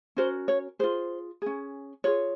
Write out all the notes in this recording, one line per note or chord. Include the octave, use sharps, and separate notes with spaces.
C#4 F#4 A#4 C5
C#5
F4 G#4 C5
C#4 G#4
F4 G#4 C#5